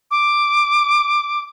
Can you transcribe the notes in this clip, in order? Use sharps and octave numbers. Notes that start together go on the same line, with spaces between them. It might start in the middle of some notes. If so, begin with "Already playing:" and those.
D6